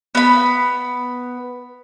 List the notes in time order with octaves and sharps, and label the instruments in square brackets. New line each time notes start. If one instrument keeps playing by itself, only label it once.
[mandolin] B3 B5